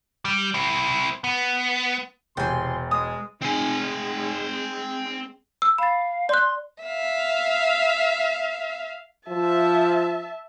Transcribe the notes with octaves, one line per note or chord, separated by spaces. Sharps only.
G3
C4 E4
B3
E1 C3 G5 G#5 C6
G#3 D#6
G#3 C4 G#5
E6
F5 B5 A6
D5 C6 F#6
E5 F5
F3 E5 A5